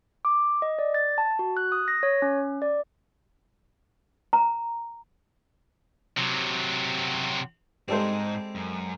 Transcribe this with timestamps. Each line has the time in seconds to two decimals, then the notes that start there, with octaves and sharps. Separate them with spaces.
0.25 D6
0.62 D#5
0.79 D5
0.94 A6
1.18 A5
1.39 F#4
1.57 F#6
1.72 D#6
1.88 A#6
2.03 C#5
2.22 C#4
2.62 D5
4.33 A#5
6.17 C3 F#3
7.88 G#2 G3 G#3 C4 D#4 A4 C5
8.55 F#2